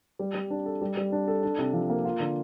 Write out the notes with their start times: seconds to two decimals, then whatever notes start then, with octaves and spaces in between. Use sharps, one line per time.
0.19 G3
0.34 G3
0.50 D4
0.66 A4
0.81 G3
0.97 G3
1.12 D4
1.28 A4
1.43 D4
1.59 C3
1.73 F3
1.90 A#3
2.05 F4
2.20 D3